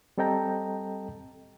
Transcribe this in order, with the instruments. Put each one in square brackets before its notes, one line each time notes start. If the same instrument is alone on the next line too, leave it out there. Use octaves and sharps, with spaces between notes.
[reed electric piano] G3 C4 A4 D#5 G5 A#5